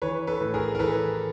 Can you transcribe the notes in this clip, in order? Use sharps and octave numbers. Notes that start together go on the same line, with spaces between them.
E3 B4 C#5
A4 B4
A2
G#4 A#4
A#4
E3 A4 B4